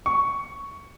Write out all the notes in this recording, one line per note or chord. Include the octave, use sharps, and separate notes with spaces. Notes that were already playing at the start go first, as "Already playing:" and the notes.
C#6